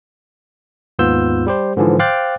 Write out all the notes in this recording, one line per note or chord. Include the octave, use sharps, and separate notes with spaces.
D#2 G#2 B3 F4 E6 G6
G3 G4 C5
G#2 D3 E3 F3
C5 F5 G5 D6 F#6 A6